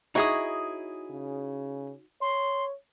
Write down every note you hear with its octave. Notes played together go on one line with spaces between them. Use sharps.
D#4 E4 F#4 G#4 C#5 D#6
C#3
C#5 C6